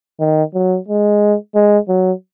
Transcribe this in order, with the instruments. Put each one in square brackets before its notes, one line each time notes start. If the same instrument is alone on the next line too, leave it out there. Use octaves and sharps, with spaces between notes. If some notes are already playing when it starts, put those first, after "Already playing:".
[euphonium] D#3
F#3
G#3
G#3
F#3